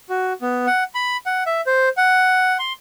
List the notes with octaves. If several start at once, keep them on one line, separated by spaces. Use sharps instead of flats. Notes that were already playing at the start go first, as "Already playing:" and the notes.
F#4
B3
F#5
B5
F#5
E5
C5
F#5
C6